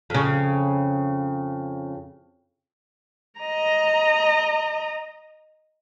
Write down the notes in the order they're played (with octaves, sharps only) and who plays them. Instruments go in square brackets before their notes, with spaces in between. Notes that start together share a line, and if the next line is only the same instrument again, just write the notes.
[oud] F2 C#3
[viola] D#5 A#5